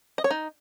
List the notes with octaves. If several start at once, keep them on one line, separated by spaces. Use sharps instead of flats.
D#5
C#5
D#4